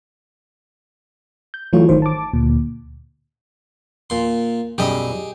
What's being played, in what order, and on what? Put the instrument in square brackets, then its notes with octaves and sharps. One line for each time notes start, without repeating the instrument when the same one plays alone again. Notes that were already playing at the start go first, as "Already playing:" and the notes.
[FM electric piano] G6
E3 F#3 A3 F4 C#5
G#1 D#3 C5
A5 D6
D2 A#2
[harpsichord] A#2 C6
[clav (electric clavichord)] B1 F#2 G3 [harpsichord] G4 G#4 D#5